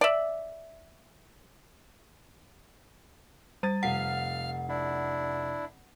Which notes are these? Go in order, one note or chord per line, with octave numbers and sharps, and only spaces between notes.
D5 E5
G3 A6 D#7
F1 F5 F#5 F6 C7
D4 E4